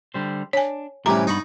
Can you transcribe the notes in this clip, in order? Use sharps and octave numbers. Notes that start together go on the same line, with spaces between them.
D3 G3 C5
D4 C#5 G#5
A2 C3 E3 G3 C#4 A#5
G2 B3 D#4 B5 C#6